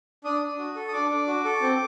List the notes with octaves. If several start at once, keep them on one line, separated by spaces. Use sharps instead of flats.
D4 D#6
D4
F#4
A4
D#6
D4 D6
D4
F#4
A4
C4